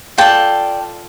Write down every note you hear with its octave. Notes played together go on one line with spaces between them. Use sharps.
F4 A4 D5 G5 A5